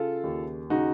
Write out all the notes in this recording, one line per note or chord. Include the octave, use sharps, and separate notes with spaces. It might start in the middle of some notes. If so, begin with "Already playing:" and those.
Already playing: C#3 F4 A4
D#2
C#3 D#4 F#4